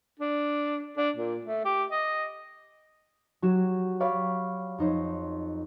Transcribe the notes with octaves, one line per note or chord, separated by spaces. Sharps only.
D4
D4
A#2
A3
G4
D#5
F#3 F#4 G4 C#5 E7
C#5 D5 F5 G5 B5 C#6
F2 D#4 C5 C#5